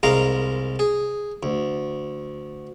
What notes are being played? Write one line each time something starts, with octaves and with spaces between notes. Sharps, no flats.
C2 G#3 A#4 F5 A#5
G#4
D2